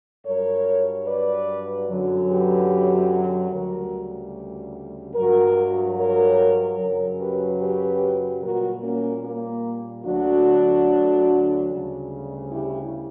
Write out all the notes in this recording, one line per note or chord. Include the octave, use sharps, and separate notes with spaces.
G2 F#3 A#4 C#5
B4 D5
F#2 D3 F#3
G4 B4
D2 C#3 G3 F#4 A#4
G2 F#3 F#4 A#4
A#4 C#5
F#2 C#3 F#3 A#4 C#5
G4 B4
G4 B4
A#2 G3 F#4 A#4
A#3 C#4
A#3
D2 D3 F#3 D4 F#4
D2 C#3 G3
E4 G4